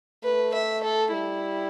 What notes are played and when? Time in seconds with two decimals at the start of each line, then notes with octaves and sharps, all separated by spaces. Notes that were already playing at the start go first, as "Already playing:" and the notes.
0.24 A3 B4
0.54 E5
0.83 A4
1.13 G3 E4